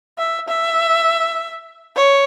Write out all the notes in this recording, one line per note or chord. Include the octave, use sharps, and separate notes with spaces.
E5
E5
C#5